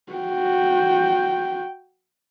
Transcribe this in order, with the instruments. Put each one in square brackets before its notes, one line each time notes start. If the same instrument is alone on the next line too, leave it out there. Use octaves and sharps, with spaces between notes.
[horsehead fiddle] F#4 G5